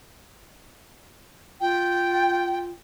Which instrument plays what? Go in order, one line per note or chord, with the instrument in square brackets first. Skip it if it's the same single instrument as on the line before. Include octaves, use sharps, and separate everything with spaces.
[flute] F4 [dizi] G5